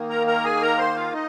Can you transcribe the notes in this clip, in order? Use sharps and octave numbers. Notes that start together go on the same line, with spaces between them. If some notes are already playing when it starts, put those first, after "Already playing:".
Already playing: D#3 A#3
A#4 A#5
A#4 A#5
G#4 G#5
A#4 A#5
C5 C6
F4 F5
D#4 D#5